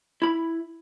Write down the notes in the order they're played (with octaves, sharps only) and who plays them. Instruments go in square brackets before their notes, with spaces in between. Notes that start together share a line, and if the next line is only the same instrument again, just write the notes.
[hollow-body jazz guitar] E4 B5